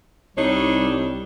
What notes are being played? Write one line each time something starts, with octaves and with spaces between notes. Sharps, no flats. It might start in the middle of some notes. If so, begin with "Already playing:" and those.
C2 G3 D4 D#4 C#5